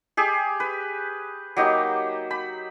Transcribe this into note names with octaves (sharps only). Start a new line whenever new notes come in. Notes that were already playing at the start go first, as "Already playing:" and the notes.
G4 G#4
B4
F#3 A#3 D#4 G4
B5